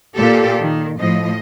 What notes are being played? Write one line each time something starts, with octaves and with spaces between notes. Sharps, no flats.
A#2 G4 A4
D#3
A2 F3 D#5